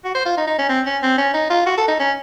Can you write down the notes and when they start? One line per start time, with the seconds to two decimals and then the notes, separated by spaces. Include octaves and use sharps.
0.04 F#4
0.15 C5
0.25 F4
0.37 D#4
0.47 D#4
0.58 C#4
0.69 C4
0.86 C#4
1.02 C4
1.18 C#4
1.34 D#4
1.50 F4
1.66 F#4
1.77 A4
1.88 D#4
2.00 C#4